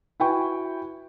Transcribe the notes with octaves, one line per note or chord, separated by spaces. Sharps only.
E4 F#4 B4 G5 G#5 C#6